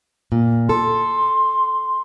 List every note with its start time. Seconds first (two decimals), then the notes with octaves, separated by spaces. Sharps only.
0.32 A#2
0.69 A4 C6